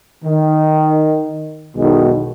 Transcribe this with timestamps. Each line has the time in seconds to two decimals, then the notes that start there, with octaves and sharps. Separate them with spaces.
0.25 D#3
1.77 B1 E2 B2 D#3 G#3